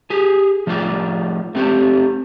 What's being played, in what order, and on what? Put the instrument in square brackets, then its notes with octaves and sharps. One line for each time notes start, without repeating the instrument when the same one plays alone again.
[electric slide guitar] G4 G#4
F3 A3 F4 G#4 D5
A3 C4 G4 A4